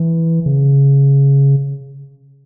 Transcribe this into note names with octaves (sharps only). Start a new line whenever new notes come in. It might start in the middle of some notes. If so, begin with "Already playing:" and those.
Already playing: E3
C#3